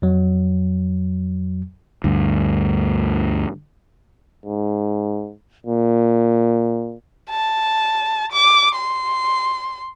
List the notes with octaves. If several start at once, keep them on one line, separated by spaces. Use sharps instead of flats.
F2 F#3
D2 G2
G#2
A#2
A5
D6
C6